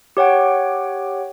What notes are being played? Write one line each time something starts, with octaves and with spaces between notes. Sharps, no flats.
G4 C#5 F#5 G5